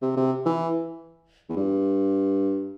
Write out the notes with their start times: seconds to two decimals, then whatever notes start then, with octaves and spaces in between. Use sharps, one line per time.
0.02 C3
0.17 C3
0.46 E3
1.49 E2
1.56 G2